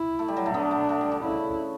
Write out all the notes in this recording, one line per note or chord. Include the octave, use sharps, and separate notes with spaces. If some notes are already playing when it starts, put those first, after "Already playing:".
Already playing: E4
A3
G3
F#3
A3
B3 D4
A3
A3
G3
D3
C#3 E4